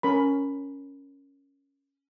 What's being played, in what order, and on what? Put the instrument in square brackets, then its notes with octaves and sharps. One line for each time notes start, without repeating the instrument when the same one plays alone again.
[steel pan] C#4 A#4 B5